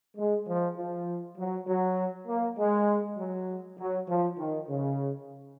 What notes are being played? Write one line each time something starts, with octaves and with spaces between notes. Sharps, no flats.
G#3
F3
F3
F#3
F#3
A#3
G#3
F#3
F#3
F3
D#3
C#3